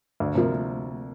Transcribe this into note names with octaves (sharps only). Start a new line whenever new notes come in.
D2
C3 F3 A#3